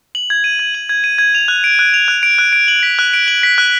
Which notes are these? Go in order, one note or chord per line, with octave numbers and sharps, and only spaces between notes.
F#7
G#6
D#7
G#6
F#7
G#6
D#7
G#6
F7
F#6
D7
F#6
F7
F#6
D7
F#6
D7
F#7
B6
F#6
D7
F#7
B6
F#6